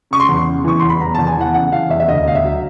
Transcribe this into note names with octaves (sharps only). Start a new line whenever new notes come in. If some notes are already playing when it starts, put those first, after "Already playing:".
C#3 C#6
C6
E2
C#3
E3 C#6
E2 C6
B5
E2 A#5
E2 A5
G#5
E3 F#5
C#3 F#5
E3 F5
E2 E5
E5
D2 D#5
D2 F5
E5
F#3